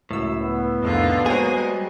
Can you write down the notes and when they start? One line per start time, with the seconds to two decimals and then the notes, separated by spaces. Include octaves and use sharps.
0.11 C#2 F#2 A2 E6
0.40 B3
0.83 C2 F2 D3 D#3 F4
1.26 F#3 G#3 A#3 G#4 C5 C#5 G#5 A#6
1.55 G3